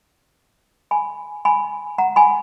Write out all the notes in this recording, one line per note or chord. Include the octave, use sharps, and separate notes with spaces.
G#5 B5
G#5 B5
F#5 A#5
G#5 B5